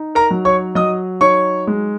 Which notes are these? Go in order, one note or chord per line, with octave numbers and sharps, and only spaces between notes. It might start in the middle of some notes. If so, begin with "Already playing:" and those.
Already playing: D#4
A#4 A#5
F#3
C#5 C#6
F#3 D#5 D#6
D#4 C#5 C#6
G#3